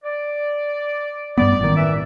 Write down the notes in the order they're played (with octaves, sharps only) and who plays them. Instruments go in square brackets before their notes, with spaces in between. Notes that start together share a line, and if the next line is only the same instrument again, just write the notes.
[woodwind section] D5
[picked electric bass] G2 G3 B3 [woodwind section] D5
[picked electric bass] A1 D#3
[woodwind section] E3 E5